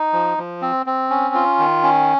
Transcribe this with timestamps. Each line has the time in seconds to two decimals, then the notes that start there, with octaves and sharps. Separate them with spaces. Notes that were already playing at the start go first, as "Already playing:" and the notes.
Already playing: D#4
0.13 F3
0.38 F3
0.62 C4
0.86 C4
1.10 C#4
1.34 F4
1.59 D#3
1.83 C#4